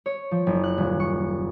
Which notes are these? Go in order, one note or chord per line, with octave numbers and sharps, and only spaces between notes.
C#5
F3
F#1
F#6
D#1
C#6